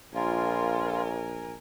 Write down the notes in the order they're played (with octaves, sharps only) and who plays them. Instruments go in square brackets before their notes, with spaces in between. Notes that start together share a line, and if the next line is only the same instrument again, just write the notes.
[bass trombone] A#1 [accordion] F4 [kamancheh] A#4 G#5